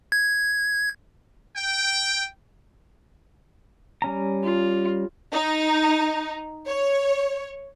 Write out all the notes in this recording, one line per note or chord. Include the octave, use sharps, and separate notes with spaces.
G#6
G5
G3 C#4 A#5
F4
D#4
C#5